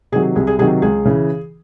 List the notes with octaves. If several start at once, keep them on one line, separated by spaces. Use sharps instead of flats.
C3 D#3 F#3 G#4
C2 G#4
G#4
C3 D#3 F#3 G#4
C#2 G#4
C#3 E3